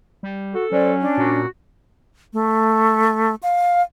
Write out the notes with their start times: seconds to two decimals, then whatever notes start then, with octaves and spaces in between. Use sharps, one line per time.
0.23 G3
0.55 F#4 A4
0.72 F#3 C#4 C5 D5
1.01 D4
1.18 A#2 F#4
2.33 A3
3.43 F5